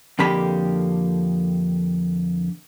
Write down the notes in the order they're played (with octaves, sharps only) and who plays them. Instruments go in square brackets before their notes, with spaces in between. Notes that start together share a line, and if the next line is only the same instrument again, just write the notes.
[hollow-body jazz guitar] F2 D3 A#3 G4 B5